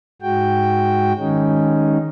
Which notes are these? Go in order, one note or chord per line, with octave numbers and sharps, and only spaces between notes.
G#2 G#3 F#4 G5
D#3 G#3 C#4 D#4